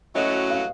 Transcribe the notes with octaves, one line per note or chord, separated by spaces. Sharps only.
A2 F#3 A3 C#4 F#4 D#5
F5